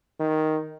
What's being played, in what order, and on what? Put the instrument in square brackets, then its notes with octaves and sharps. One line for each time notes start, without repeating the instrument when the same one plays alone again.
[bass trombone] D#3